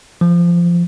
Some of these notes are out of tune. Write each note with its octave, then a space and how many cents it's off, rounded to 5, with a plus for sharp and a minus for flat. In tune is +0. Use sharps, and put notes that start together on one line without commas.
F3 -15